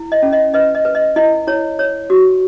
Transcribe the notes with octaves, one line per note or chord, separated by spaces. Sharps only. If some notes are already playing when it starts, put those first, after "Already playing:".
Already playing: E4
D#5
C#4
D#5
B4 D#5
D#5
B4
D#5
E4 D#5
E4 C#5
C#5
F#4